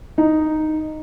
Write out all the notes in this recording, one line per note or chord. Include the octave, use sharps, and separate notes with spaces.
D#4